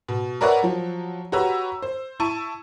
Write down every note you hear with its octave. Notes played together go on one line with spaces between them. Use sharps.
B2
A#4 B4 C#5 D5 E5 F#5
F3 F#3
F#4 G4 B4 C#5 A#5 E6
C5
E4 A5 C#6 E6 D#7